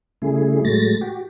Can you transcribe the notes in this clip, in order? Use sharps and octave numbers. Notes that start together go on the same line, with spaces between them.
C#3 G3 A3 E4 G#4
A2 F#3 G#3 A3 A6 A#6
F#4 G4